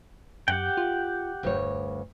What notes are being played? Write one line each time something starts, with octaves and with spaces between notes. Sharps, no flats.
F#2 G4 F#5 G5
F4
E1 D2 G2 C#5